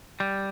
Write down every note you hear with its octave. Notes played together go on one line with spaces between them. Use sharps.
G3